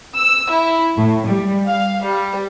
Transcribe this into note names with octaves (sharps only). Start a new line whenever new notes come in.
E6
E4
A2
G3
F5
G3